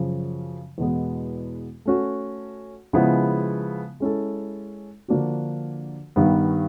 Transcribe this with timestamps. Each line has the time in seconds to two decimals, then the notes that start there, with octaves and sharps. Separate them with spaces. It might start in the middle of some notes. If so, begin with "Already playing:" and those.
Already playing: F#2 C#3 F3
0.78 E2 B2 G#3 B3
1.85 A3 C#4 F#4
2.93 C#3 F3 G#3 B3 E4
4.00 G#3 C#4 E4 A4
5.08 D3 F3 A#3 D4 F#4
6.16 G2 D#3 G3 B3